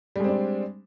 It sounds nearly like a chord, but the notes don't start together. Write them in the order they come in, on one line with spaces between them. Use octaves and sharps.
G3 G#3 C4 D4